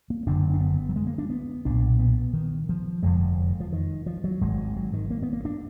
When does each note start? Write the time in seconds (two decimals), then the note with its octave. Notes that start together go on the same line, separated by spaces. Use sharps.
0.10 A#3
0.26 F#1 F#2 D3 D4
0.54 D4
0.61 B3
0.89 F#3
0.96 G#3
1.07 A#3
1.18 D4
1.30 B3
1.65 B1 A#2 D4
1.99 B3
2.33 D#3
2.69 F3
3.03 F1 F2 D3 G#3
3.60 F3
3.72 D#3
4.06 F3
4.24 F#3
4.41 G#1 G#2 G#3
4.76 F#3
4.94 D#3
5.11 A#3
5.23 B3
5.33 A#3
5.45 D4